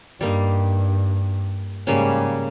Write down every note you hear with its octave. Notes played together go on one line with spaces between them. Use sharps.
G2 G3 A#3 D#4
G#2 C#3 G3 A#3 C#4